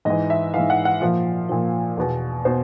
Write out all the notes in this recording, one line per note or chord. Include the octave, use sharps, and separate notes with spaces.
G#2 E3 D#5
E5
G#2 E3 F5
F#5
F#5
A#2 F3 F5
A#2 F3
E2 B2
B2 C5